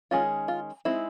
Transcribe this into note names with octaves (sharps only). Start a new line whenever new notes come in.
D#3 G#3 C#4 F4
F4
G#3 C4 D#4 E4